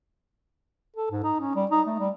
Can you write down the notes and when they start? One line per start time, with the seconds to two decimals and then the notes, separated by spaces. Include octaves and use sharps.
0.96 A4
1.11 G#2
1.24 D#4
1.40 C#4
1.55 G3
1.71 D#4
1.86 A3
1.99 G3